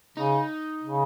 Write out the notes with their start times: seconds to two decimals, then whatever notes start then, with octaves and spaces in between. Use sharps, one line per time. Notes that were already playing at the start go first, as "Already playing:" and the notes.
0.17 C#3 D#4
0.83 C#3